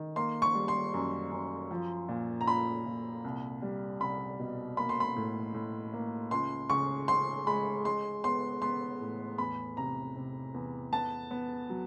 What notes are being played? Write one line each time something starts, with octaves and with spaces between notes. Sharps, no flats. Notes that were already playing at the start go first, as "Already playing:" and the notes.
Already playing: D#3
A#3 C6
C#6
G3
C6
F#2
F#2
F3
A#2
A#5
A#2 B5
A#2
C2
G3
C2 B5
B2
A#3 B5
C6
B5
A2
A2
A#3
C#2 C6
C#3 C#6
C#3 C6
G#3 B5
G#3 C6
B3 C6
B3 C6
A2
E2 B5
C3 A#5
C3
E2
B3 A5
B3
F#3